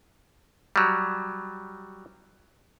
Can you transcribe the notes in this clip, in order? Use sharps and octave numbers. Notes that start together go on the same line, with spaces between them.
F#3 G3